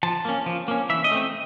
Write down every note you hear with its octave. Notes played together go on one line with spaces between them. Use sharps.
F3 A5
A#3 C#4
F3
A#3 C#4
E3 E5
D#5
A3 C4